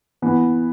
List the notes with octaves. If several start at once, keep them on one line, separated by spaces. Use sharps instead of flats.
E3 B3